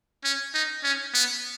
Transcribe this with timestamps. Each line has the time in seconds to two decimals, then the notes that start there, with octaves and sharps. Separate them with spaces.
0.24 C#4
0.54 D#4
0.84 C#4
1.14 B3